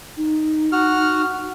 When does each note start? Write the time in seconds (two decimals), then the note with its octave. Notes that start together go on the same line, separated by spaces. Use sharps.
0.17 D#4
0.72 F#4 F6